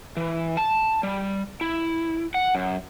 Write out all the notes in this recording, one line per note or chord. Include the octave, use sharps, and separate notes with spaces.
E3
A5
G3
E4
F#5
F#2